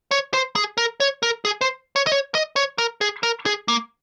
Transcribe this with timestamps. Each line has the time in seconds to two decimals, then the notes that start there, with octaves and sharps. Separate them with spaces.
0.11 C#5
0.34 C5
0.56 G#4
0.78 A#4
1.00 C#5
1.23 A#4
1.45 G#4
1.61 C5
1.96 C#5
2.07 D#5
2.12 C#5
2.35 D#5
2.56 C#5
2.78 A#4
3.01 G#4
3.23 A#4
3.46 G#4
3.68 A#3